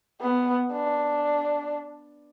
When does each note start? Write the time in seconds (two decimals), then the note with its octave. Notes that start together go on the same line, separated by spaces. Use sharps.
0.21 B3
0.73 D4